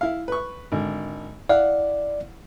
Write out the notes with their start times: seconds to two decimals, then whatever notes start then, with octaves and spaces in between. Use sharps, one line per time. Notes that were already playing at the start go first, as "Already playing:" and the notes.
0.01 E4 F5
0.28 B4 C#6
0.72 G#1 D3
1.49 E4 D5 F5 F#5